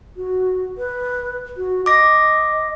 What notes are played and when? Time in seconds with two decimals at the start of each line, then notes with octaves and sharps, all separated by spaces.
0.17 F#4
0.78 B4
1.57 F#4
1.86 D#5 D6 A#6